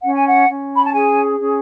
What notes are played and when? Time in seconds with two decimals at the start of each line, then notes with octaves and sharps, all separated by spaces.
0.02 C#4 F#5
0.15 G#5
0.27 F#5
0.48 C#4
0.75 B5
0.85 A5
0.93 G#4 G#5
1.38 C#4